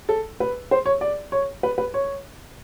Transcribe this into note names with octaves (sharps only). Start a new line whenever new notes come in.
A4
B4
C5
C#5
D5
C#5
B4
B4
C#5